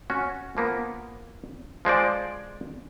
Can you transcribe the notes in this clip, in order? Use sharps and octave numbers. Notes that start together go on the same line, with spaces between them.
C#4 F#4
F3 A#3 B3
F3 G#3 C5 D5